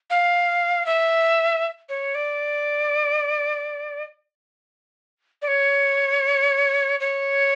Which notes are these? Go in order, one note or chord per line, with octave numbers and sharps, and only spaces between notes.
F5
E5
C#5
D5
D5
C#5
C#5